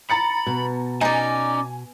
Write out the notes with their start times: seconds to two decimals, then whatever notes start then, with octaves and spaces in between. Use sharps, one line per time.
0.10 A#5 B5 A6 C#7
0.46 B2
1.01 C#4 D#4 D5 G#5